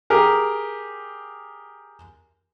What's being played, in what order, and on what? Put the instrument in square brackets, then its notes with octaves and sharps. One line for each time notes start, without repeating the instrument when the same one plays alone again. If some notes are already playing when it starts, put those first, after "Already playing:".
[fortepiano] G4 G#4 A#4